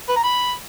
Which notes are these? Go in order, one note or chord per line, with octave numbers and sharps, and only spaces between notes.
B4
A#5
B5